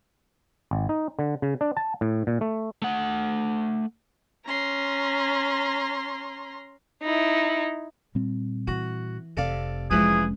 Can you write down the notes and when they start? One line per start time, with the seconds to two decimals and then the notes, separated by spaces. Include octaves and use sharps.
0.71 G#1
0.89 D#4
1.19 D3
1.42 C#3
1.61 D4
1.77 A5
2.01 A2
2.27 A#2
2.41 A3
2.82 A3 F#5
4.46 C#4 A#5 C6
7.03 D#4 E4
8.15 A#2 G3 C4
8.67 E3 F#4
9.37 F1 C3 C4 A4 D5 F5
9.91 E3 F3 G#3 C#4 G#4 B4